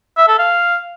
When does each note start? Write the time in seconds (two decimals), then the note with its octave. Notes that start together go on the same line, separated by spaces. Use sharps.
0.17 E5
0.28 A4
0.39 F5